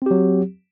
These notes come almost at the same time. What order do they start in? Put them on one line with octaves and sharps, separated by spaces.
C4 G4 F#3